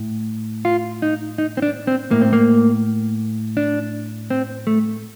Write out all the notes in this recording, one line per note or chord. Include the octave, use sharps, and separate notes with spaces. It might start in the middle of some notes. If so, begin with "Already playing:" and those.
Already playing: A2
F4
D#4
D#4
C4
D4
C4
A2 A#3
C4
A#3
D4
C4
A3